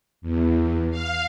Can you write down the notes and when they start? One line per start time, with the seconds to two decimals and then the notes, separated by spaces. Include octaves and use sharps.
0.21 E2
0.90 F5